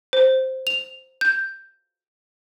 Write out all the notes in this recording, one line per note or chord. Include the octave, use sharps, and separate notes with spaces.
C5
F7
G6